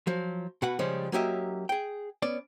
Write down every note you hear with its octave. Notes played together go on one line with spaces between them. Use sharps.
F3 F#3
B2 F#4 B4 F#5
C#3 F3 G3 G#3 C#4
F#3 A#3 C#4 G4 D#5 E5
G#4 G5
B3 C#4 D5